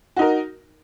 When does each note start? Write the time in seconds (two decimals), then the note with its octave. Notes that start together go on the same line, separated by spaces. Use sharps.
0.16 F#4
0.19 D#4
0.22 A#4